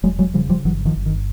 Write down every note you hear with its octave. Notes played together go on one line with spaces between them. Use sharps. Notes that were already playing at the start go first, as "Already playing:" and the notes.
E1 F#3 G#3
F#3 G#3
C#3 F3 G3
F3 G3
G1 E3 F#3
D#3 F3
G1
D#3